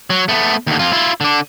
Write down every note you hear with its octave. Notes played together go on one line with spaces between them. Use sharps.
F#3
A3 B3
D#2 D3
F2 F4
E4 F4
D3 D4